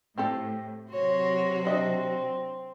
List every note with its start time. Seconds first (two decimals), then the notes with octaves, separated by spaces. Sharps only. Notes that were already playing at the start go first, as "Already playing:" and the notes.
0.18 A2 C4 G4 A4
0.90 C3 F#3 F#4 C#5 C6
1.65 C4 D4 D#5 E5